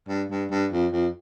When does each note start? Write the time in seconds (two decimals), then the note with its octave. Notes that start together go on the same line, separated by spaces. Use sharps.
0.09 G2
0.30 G2
0.51 G2
0.72 F2
0.92 F2